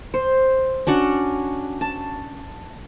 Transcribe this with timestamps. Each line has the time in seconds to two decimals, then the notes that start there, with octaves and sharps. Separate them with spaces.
0.14 C5
0.87 C#4 D4 F#4 F#5
1.81 A5